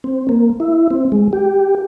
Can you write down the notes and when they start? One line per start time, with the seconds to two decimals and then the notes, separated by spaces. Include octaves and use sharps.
0.04 C4
0.29 A#3
0.60 E4
0.90 C4
1.12 G#3
1.33 G4